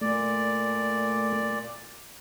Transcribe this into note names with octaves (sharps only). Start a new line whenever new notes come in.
A#2 A3 D5